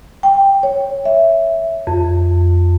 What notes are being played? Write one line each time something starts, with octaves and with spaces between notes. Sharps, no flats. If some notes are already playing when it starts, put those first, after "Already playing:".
G5
C#5
E5
F2